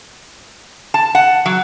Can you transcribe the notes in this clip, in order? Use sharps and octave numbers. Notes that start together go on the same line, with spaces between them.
A5
F#5
F#3